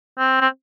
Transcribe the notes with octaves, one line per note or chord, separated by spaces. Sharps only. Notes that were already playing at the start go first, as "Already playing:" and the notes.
C4
C4